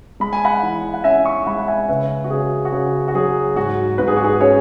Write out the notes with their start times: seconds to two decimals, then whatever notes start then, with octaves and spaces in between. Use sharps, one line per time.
0.20 G#3 B5
0.33 G#5
0.45 F#5 B5
0.63 E3
0.94 F#5
1.04 C#4 E5 G#5
1.25 G#5 C#6
1.46 G#3 F#5 B5
1.58 F#5
1.68 E5 G#5
1.88 C#3 B4 E5
2.24 F#4
2.30 C#3 G#4
2.65 F#4
2.72 C#3 G#4
3.08 F#4
3.14 F#3 G#4
3.56 G#2 F#4
3.98 G#2 B4
4.08 G#4
4.17 F#4
4.24 G#4
4.41 C#4 G#4 C#5